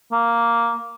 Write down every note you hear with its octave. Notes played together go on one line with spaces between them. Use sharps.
A#3